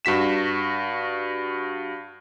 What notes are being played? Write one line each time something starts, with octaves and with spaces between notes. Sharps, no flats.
G2 F#4 B6 E7